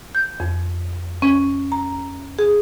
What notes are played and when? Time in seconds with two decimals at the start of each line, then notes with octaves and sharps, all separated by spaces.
0.15 G6
0.40 F2
1.22 C#4
1.72 A#5
2.39 G#4